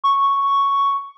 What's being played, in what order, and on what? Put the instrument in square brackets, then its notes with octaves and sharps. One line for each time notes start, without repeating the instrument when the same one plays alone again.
[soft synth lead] C#6